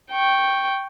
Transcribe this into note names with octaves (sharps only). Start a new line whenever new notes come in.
G5 C#6